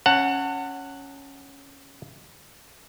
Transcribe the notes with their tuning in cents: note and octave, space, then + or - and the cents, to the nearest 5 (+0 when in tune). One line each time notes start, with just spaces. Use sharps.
C#4 +0 F#5 +0 A5 +40